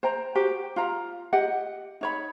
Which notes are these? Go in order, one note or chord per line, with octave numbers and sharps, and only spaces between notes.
C5 G5 A#5
F#4 G4 C5
F4 F5 A#5
G4 D#5 F#5
D#4 C#5 B5